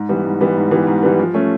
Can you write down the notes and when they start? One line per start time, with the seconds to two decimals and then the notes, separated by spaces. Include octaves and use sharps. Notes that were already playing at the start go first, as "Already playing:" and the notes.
Already playing: G#2
0.09 E3 G3 B3
0.25 G#2
0.41 E3 G3 B3
0.57 G#2
0.71 E3 G3 B3
0.87 G#2
1.03 E3 G3 B3
1.19 F3
1.34 A3 C#4